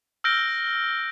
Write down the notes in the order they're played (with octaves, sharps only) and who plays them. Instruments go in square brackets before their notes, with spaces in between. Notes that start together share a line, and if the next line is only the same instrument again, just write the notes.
[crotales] E6 F6 G6 A#6 D7 G7